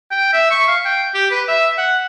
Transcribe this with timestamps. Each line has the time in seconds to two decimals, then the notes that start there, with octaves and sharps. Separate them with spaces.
0.11 G5
0.33 E5
0.51 C#6
0.68 F5
0.85 G5
1.14 G4
1.31 B4
1.48 E5
1.78 F#5